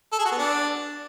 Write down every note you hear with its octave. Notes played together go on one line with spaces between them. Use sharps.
A4
G#4
F#4
B3
D4